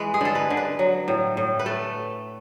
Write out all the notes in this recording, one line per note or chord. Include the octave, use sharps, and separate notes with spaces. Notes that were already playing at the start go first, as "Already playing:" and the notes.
Already playing: E3 G#3 B4
G#4
D3 A4
B4
D3
B4
F#3
A2
A2
B4
A3 A4